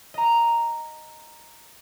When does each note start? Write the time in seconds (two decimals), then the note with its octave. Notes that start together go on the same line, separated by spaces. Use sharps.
0.14 D#5 A#5